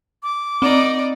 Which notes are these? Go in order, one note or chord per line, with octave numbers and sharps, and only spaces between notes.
D6
C4 D#4 D5